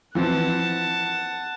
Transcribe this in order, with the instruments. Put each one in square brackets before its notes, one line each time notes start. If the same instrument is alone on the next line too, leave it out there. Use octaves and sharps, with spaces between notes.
[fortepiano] E3 F3 C4 [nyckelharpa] F#5 A5